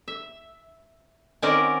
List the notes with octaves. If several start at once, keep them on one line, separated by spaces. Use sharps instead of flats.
E5
D#3 C4 C#4 F#4 A#4 D5